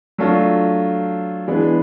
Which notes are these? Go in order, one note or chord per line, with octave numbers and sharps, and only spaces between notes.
F#3 A3 D4 F4
E3 G#3 B3 D4